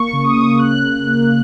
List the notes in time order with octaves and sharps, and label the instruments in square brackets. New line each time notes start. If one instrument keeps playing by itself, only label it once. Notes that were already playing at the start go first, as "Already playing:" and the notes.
Already playing: [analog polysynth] A#3 C#6
C#3
D#6
A#3
C#3 F#6
C#3
A#3